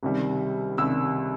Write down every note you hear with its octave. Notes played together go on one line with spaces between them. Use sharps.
C#2 C3 D#3 G3
C#2 C3 D#3 G3 E6